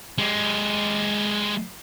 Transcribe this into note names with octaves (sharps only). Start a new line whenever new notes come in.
G#3 G4